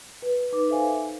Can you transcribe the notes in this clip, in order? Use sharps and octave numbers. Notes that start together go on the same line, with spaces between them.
B4
D#4 B4 D6
A4 C5 E5 F5 G#5